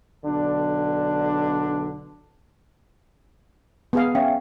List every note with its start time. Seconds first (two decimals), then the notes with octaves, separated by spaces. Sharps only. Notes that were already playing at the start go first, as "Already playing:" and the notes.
0.23 B1 D3 D4
3.93 B3 G#4 F5
4.15 C#4 E5 F5 G5